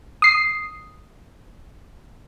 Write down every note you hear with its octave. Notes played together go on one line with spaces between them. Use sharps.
D#6 C7